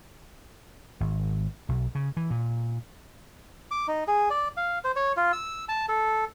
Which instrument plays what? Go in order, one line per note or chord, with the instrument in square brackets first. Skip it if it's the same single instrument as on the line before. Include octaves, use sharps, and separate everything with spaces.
[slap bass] G#1
B1
C#3
E3
A#2
[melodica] D6
D#4
G#4
D5
F5
C5
C#5
F4
E6
A5
A4